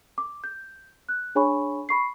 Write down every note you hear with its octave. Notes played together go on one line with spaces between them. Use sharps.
D6
G6
F#6
D4 G#4 C#5 G#5 B5 C#6
B5 C#6 C7